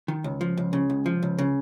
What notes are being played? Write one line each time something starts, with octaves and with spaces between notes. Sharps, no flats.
D#3
C#2
F3
C#2
C#3
C#2
F3
C#2
C#3